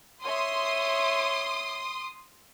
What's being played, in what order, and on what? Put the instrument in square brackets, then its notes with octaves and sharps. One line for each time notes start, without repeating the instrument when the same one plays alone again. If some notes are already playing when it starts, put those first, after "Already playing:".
[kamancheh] C#5 E5 [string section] C6 D#6